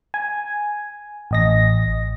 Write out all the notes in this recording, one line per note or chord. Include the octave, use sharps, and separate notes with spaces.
G#5
A1 D#5 A#6